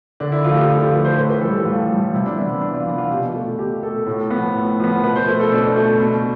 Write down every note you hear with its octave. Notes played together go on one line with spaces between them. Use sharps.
D3 D4
E4
F3 A3 F4
G4
D3 F4
A4
G4
F3 A3 B4
C5
A2 B4
B4
E3 G3 A4
G4
A2 F4
E3 G3
C3 E4
D4
E3 B3 E4
E4
C3 D4
F4
E3 B3 E4
F4
B2 G4
A3
B2 G4
A3 A4
A2
F3 B3
A2
F3 B3
B2 B4
C5
A3 B4
A4
B2 D4
A3
B2